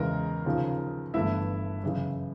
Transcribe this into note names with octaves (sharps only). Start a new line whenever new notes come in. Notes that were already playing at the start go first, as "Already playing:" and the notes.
Already playing: E2 C#3 E3 G#3 A#4
D#2 C#3 F3
G1 G2 E3 A3 E4 E5
F#2 C#3 E3